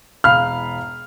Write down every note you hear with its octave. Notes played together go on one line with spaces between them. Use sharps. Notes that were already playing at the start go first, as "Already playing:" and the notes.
E1 F5 B5 F6